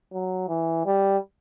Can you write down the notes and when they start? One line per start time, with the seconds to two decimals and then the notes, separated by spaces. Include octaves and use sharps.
0.13 F#3
0.49 E3
0.86 G3